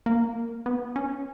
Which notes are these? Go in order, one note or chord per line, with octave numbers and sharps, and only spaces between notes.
A#3
B3
C#4